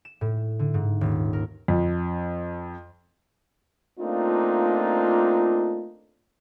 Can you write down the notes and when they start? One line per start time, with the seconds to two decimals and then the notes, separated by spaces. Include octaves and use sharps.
0.05 E7
0.21 A2
0.59 D3
0.74 G#2
1.01 D#1
1.33 A#4
1.68 F2
4.00 A3 A#3 C4 D4 D#4 F4